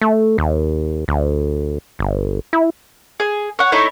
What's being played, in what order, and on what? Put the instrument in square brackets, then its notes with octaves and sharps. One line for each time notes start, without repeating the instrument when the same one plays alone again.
[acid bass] A3
D#2
D2
G1
E4
[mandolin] G#4
C#5 F#5
A3 D#4 E4 C#5